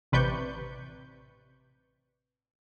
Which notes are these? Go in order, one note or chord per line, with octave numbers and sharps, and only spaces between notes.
A1 C3 B4 D5 C#6 G6